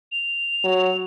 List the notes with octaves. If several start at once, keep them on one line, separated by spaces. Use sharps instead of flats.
F7
F#3